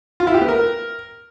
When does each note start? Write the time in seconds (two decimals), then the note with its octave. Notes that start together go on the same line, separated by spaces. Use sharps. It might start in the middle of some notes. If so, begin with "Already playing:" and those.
0.20 F4
0.27 E4
0.34 G4
0.41 B3
0.48 A#4